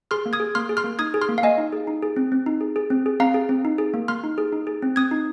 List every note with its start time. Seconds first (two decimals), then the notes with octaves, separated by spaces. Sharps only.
0.11 G#4 C6 F6
0.26 A#3
0.33 D#6 G#6
0.40 G#4
0.55 A#3 C6 F6
0.69 G#4
0.77 C6 F6
0.84 A#3
0.99 D#4 D#6 G#6
1.14 G#4
1.21 C6 F6
1.29 A#3
1.38 F5
1.43 A#3 D#5 G#5
1.58 D#4
1.72 G#4
1.87 D#4
2.02 G#4
2.16 C4
2.32 C4
2.46 D#4
2.61 G#4
2.76 G#4
2.90 C4
3.06 G#4
3.20 C4 F5 A#5
3.34 G#4
3.49 C4
3.65 D#4
3.78 G#4
3.94 A#3
4.08 A#3 C6 F6
4.24 D#4
4.38 G#4
4.52 D#4
4.67 G#4
4.82 C4
4.96 C4 D#6 G#6
5.11 D#4